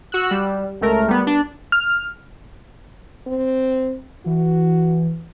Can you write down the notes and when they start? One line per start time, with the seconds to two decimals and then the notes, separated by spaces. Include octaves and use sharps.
0.12 F#4 E6 F#6
0.31 G3
0.81 C#2 A3 A#4
1.08 G3 B3
1.27 D4
1.72 F6
3.27 C4
4.26 E3 F#4